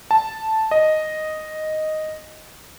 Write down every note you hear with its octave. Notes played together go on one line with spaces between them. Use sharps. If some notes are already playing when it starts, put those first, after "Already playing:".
A5
D#5